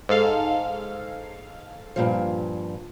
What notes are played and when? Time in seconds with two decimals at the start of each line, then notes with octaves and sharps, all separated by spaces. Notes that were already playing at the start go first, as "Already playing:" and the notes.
0.09 G#2 A4 F5
1.96 G2 A#2 F3